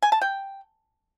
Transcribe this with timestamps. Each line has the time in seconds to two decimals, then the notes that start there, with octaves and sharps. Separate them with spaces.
0.02 G#5
0.12 A5
0.21 G5